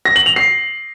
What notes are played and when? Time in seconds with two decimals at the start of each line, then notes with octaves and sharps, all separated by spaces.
0.05 A#6
0.16 F#7
0.26 F7
0.36 C7